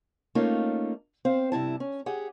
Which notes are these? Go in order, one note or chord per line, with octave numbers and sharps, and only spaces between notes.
A3 A#3 C#4 D#4 F4
C4 C5 F5
G2 C3 E4 A5
C#4
G4 G#4 F#5